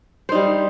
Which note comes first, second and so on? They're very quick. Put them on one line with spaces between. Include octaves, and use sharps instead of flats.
C5 D#4 G3